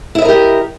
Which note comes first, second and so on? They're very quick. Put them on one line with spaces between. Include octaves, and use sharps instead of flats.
E4 E5 D#5 A#4 G4